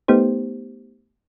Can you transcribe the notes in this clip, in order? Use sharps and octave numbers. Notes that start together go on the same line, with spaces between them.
A3 B3 D#4 G4 C5